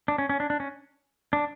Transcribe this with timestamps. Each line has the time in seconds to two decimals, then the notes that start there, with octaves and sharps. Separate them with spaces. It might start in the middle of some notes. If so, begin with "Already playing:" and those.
0.08 D4
0.18 C#4
0.29 C#4
0.40 D4
0.50 D4
0.60 C#4
1.33 D4